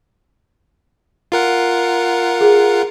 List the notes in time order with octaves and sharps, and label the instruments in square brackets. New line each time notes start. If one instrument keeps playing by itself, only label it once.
[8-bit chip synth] F4 A#4 F#5
[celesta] G#4